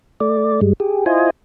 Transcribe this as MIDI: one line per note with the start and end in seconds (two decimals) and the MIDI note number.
0.20 0.60 57
0.20 0.60 74
0.61 0.73 43
0.61 0.73 55
0.61 0.73 56
0.80 1.05 67
0.80 1.05 68
1.06 1.30 64
1.06 1.30 65
1.06 1.30 72
1.06 1.30 75
1.06 1.30 80